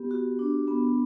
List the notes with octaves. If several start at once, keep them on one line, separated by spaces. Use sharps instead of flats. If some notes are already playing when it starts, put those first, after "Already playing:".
Already playing: B3 G4
F#4
D4
B3